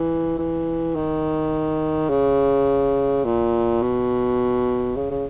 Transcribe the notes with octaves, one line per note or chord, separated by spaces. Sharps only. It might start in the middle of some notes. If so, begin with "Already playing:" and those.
Already playing: E3
E3
D#3
C#3
A#2
B2
C#3
C#3